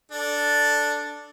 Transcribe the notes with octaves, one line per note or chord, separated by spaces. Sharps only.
D4 A4